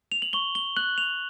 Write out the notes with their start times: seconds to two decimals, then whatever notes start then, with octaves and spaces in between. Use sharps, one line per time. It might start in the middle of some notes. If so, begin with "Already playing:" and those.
0.12 F7
0.22 F#7
0.33 C#6 G7
0.55 G7
0.77 F#6 F#7
0.98 F7